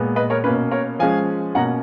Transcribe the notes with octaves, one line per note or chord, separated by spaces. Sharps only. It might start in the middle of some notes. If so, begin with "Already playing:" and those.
Already playing: A#2 G#3 B3
B4 D#5
A#4 C#5
B2 A#3 C#4 B4
A#4 C#5
F3 G#3 C#4 F5 G#5
B2 A#3 C#4 F#5 A#5